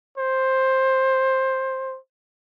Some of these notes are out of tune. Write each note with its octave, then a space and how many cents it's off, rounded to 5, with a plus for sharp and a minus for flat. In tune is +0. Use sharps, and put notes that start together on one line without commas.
C5 +10